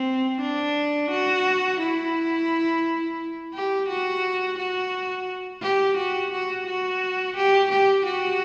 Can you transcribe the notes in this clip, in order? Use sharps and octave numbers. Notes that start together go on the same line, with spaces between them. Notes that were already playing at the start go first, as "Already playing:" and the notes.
Already playing: C4
D4
F#4
E4
G4
F#4
F#4
G4
F#4
F#4
F#4
G4
G4
F#4